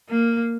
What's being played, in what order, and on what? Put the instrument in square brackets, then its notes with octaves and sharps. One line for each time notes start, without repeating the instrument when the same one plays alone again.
[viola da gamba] A#3